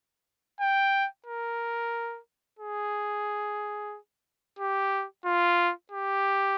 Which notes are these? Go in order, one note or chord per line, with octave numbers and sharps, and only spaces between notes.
G5
A#4
G#4
G4
F4
G4